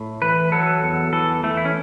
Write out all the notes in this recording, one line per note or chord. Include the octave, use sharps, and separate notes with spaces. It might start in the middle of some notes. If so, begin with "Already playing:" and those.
Already playing: A2
E3 B4
F#3 A4
E2
E3 A4
E3 A3
E4
C#4